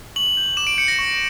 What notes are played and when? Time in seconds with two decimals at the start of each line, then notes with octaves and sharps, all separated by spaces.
0.16 C#6 F#7
0.37 G6
0.57 D6 E7
0.67 D7
0.78 G6 C#7
0.88 A#6
0.99 C#6